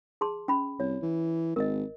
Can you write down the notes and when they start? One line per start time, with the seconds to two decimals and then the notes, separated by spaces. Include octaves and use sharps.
0.21 G#4 A5 C6
0.48 C#4 B5
0.80 C2 C#5
1.02 E3
1.56 G#1 A#4 D#5